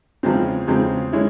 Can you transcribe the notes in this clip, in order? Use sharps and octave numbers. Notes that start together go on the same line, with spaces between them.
E2 C#3 F3 G#3 C4
E2 C#3 F3 G#3 C4
G#3 C#4 E4